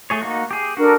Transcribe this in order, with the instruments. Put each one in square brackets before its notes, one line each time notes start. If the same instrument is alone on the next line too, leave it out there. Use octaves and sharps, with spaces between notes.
[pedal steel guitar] A3 G#4 C#5
A#3 D#4 F#4
G4 G#4
[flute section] D4 A4 A#4 [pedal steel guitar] F#4